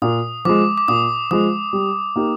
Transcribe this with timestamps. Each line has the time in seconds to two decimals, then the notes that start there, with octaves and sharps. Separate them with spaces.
0.02 A#2 D#6
0.45 F3 G#3 D6
0.78 D6
0.88 A#2 D#6
1.31 F3 G#3 D#6
1.73 G3
2.16 A#3 D#4 G4